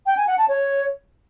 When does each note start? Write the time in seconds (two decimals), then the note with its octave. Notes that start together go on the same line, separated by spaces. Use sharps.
0.06 G5
0.17 G#5
0.27 F#5
0.38 A5
0.48 C#5